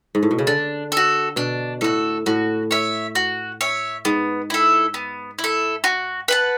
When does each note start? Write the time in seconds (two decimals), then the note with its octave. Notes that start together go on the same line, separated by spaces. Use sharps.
0.15 G#2
0.23 A2
0.31 B2
0.38 C#3
0.47 D3 D4
0.92 A4
0.97 F#4
1.36 B2 D4
1.81 A2 F#4 A4
2.26 A2 F#4
2.71 C#5 E5
3.15 F#4
3.61 C#5 E5
4.05 G#2 B3
4.50 E4 A4
4.94 B3
5.39 E4
5.44 A4
5.84 F#4
6.28 B4 F#5 A5